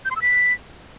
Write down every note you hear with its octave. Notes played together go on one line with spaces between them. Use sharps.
G6
C6
E6
B6